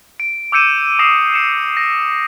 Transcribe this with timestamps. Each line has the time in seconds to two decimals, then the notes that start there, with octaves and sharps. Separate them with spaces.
0.20 D7
0.52 D6 E6 G6 C#7 D#7 E7
0.99 D#6 A#6 C7 D#7 E7
1.34 C#7 E7
1.77 A#6